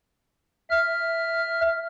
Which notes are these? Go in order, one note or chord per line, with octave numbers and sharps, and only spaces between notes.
E5 F6